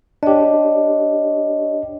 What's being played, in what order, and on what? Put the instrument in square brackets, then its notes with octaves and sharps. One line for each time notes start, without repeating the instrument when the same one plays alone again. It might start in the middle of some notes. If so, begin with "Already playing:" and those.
[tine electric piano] D4 G4 [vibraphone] C#5 D#5